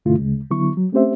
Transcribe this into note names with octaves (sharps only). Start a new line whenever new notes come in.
G2 B2 D3 A3 E4 F4
D2 C#3 G#3
D3 F#3 B3 E4 C#6
F#3
A3 C4 C#4 G4 C5 E5